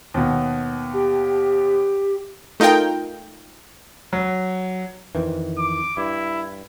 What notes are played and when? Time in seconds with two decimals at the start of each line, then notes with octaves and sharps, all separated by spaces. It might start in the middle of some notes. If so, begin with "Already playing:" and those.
0.14 D#2 B2
0.94 G4
2.60 A3 D#4 F4 A#4 G5
4.13 F#3
5.15 F2 D#3 E3
5.58 D6
5.97 G2 E4